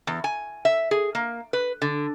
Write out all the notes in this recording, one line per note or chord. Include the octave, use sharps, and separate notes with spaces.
E2
G#5
E5
G#4
A#3
B4
D3